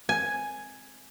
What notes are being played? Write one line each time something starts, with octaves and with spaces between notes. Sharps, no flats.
G#5